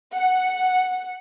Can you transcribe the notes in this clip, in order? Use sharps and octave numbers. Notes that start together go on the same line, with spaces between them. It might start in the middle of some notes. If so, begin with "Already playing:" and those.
F#5